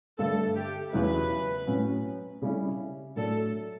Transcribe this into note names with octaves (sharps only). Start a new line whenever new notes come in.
G2 D3 A3 A4
G4
E2 C#3 F#3 B3 E4 B4
A2 F#3 C#4
C#3 G3 C#4 E4
A2 F#3 A3 D4 A4